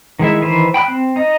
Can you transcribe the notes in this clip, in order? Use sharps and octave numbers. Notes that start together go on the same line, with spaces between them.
D#3 G#3 E4 E5
D#3 E3 B4 C5
G5 B5 D#6 F#6
C4
D#4 D#5